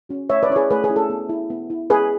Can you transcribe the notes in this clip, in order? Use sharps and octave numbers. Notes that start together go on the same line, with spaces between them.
C#4 F#4
A3 C#5 E5
B4 D5
C#4 E4 C#5
G#4 B4
A3 G#4 B4
G#4 B4
C#4 E4
A4
B3
E4
B3
E4
B3 G#4 B4